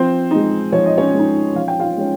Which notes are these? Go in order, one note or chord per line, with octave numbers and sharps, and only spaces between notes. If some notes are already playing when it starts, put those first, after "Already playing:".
Already playing: F3 C4 C5
G#3 D#4
F3 C#5
D#5
C#4 C#5
G#3 D#4
F3 F5
G5
F4 F5
G#3 C#4